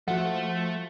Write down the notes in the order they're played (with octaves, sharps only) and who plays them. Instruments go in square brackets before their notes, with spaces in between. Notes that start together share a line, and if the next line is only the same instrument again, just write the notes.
[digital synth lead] F3 [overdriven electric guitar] A3 [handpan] F#4 F#5